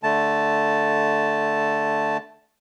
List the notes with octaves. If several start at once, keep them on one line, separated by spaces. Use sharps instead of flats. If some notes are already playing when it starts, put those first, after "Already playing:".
D3 A3 A5